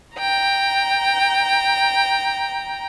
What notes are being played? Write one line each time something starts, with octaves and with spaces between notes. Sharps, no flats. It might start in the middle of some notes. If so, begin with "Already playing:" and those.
G5 A#5